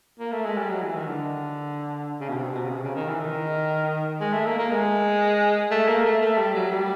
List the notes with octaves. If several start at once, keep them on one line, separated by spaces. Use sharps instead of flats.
A#3
A3
G#3
G3
F#3
E3
D#3
D3
C#3
B2
C3
B2
C#3
C3
C#3
D#3
E3
D#3
G#3
A3
A#3
A#3
G#3
A3
A#3
A3
A3
G3
F#3
G3